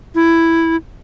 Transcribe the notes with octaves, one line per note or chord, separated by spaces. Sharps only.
E4